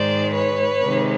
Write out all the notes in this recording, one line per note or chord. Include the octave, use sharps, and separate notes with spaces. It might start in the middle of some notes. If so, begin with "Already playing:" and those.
Already playing: G#2 D#3 G#3 C5 D5
B4 C#5
C3 D#3 G#3